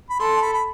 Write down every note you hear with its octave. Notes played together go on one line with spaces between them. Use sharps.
B5
A4 C6
A5
B5
B5